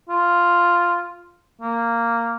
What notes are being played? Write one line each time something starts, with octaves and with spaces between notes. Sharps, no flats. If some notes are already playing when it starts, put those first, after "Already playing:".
F4
A#3